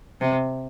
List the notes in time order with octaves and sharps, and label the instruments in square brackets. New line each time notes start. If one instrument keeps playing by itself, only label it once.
[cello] C3